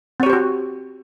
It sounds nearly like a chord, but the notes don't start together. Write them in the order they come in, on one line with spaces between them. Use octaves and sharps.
C4 C#5 G4 C5 F#4